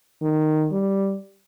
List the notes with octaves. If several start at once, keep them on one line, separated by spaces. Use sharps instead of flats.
D#3
G3